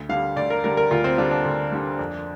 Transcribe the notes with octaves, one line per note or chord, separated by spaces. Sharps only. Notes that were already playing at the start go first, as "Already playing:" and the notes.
Already playing: D2
D3 G3 F5
D2 D5
A#4
D3 G3 A#4
A#4
D2 F4
C4
D3 G3 D4
D4
D2
D3 G3
F2